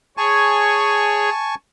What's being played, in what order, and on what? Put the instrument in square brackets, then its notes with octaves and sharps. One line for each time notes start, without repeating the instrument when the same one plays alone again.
[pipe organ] G#4 C#5 [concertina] G#5 A5 C#6